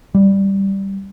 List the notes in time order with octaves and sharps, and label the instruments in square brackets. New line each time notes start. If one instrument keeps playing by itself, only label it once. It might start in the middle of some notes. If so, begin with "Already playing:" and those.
[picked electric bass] G3